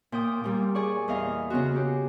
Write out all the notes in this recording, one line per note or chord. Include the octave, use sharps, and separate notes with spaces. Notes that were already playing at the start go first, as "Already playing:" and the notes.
A#2 G5 D#6
A#2 G3 A#3
G#4 D5 C#6
E2 D#5 F5
C#3 B3 F4 F#4
G4